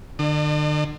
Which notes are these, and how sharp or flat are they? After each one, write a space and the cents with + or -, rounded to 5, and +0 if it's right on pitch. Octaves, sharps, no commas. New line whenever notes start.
D3 +35 D#5 -40